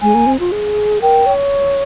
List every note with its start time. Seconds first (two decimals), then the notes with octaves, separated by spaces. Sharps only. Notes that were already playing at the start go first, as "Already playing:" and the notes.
0.01 G#3 G#5
0.15 A#3
0.26 C4
0.40 F4
0.52 G#4
1.02 A#4 G5
1.26 C#5